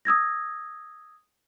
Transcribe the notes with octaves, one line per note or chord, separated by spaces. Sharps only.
D#6 E6 G#6 A#6